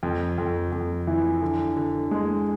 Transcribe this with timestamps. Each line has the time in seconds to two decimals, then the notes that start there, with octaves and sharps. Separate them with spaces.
0.03 F2
0.38 F2
0.72 F2
1.07 E3
1.42 D3
1.77 D3
2.11 G#3